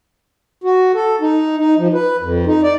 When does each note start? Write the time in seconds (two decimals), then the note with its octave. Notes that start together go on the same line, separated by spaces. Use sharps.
0.64 F#4
0.95 A4
1.21 D#4
1.58 D#4
1.78 F3
1.94 B4
2.21 F2
2.46 D#4
2.63 D5